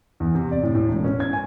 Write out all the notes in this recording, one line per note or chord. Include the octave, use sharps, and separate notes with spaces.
E2
C3
D5
A2
A2
E1
C#4
G#6
G#5